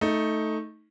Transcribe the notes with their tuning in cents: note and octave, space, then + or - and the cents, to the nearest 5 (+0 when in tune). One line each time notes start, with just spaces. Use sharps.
A3 +0 D#4 +10